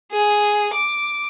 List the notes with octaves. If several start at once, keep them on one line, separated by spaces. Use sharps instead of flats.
G#4
D6